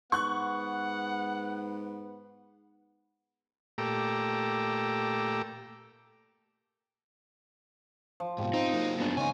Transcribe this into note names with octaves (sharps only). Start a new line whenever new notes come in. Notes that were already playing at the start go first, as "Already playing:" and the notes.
G#2 B3 F#5 C#6 F#6
A#2 A3 G4 A#5 D6 E6
F3
G#2 B2 G4
C4 D#4 C5
F#3 A#3
B3 D4
C#2 C#4 D#4 F4 G#5